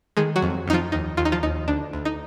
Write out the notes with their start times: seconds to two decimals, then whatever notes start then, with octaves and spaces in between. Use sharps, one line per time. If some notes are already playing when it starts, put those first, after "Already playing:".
0.17 D#3 G#3 G#4
0.36 F#3 F#4
0.42 F2
0.68 F2 D#4
0.73 F3 F4
0.92 D#2 D#4
1.17 D#2 F4
1.25 D#4
1.32 F3 F4
1.43 D#2 D#4
1.68 D2 D4
1.93 D2
2.05 D#4